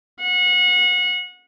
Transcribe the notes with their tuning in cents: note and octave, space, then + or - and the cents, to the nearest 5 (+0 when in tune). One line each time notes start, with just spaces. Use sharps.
F#5 -30